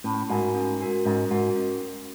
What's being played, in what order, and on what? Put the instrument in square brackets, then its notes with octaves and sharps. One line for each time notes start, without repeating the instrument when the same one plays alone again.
[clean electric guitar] A2 [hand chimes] C#4
[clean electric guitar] G#2 [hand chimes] F#4 A#4
[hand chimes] C#4
F#4 A#4
[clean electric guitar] G#2 [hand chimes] C#4
[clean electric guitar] G#2 [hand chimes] F#4 A#4
[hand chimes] C#4